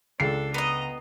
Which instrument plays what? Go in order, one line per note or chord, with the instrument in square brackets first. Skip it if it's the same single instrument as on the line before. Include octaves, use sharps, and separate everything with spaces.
[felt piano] C#2 C7 [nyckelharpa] D4 A4
[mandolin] B3 D#5 [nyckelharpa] A#5